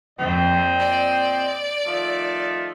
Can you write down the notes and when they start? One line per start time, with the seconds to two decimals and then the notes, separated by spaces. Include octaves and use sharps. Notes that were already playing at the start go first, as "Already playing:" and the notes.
0.18 F2 A#2 C4 D#5
0.79 D5
1.86 D#3 F3 A3